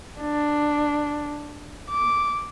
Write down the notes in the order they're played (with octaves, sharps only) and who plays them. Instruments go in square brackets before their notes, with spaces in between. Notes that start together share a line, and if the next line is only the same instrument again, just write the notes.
[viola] D4
D6